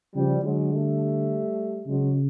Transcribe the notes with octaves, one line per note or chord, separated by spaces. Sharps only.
C#3 F3 G3
D3 F#3 G#3
G3 A3
C#3 F#3 G#3